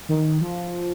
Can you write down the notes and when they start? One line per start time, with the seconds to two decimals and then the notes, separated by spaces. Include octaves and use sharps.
0.09 D#3
0.41 F3